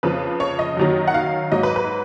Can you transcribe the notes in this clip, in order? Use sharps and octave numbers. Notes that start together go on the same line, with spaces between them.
F2 C#3 F3 B4
C#5
D#5
F#2 D#3 F#3
F#5
F5
G#2 F#3 D#5
B4
B4